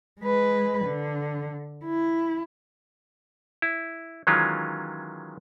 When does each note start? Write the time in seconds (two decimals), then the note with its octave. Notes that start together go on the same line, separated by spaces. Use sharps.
0.20 G#3 B4
0.85 D3
1.85 E4
3.62 E4
4.27 D#3 E3 F#3 G#3 C#4 F4